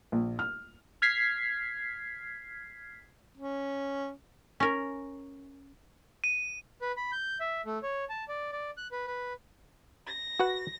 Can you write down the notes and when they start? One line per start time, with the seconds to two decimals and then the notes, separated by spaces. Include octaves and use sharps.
0.12 A#1
0.39 F6
1.02 F6 G#6 B6 C7
3.37 C#4
4.60 C#4 A#4
6.24 D#7
6.82 B4
6.97 B5
7.12 G6
7.40 E5
7.65 A3
7.83 C#5
8.09 A5
8.29 D5
8.52 D5
8.77 F#6
8.92 B4
9.07 B4
10.06 A#6
10.39 F#4 B4 F#5